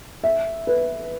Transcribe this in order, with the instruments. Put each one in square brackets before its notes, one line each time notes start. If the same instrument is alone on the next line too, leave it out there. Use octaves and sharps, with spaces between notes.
[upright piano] E5
B4